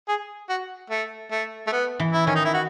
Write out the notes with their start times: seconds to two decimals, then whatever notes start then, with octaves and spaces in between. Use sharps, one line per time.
0.08 G#4
0.49 F#4
0.90 A3
1.31 A3
1.67 A3
1.72 B3
2.00 E3
2.13 E4
2.26 D#3 C#4
2.35 D#4
2.45 E4
2.54 F#4